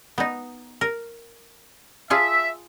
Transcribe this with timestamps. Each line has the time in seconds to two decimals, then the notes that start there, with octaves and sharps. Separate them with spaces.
0.18 B3 D#4
0.81 A#4
2.10 F4 G#4 E5 A5